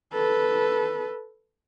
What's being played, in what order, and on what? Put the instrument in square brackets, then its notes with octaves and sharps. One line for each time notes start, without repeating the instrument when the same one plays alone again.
[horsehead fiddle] A4 B4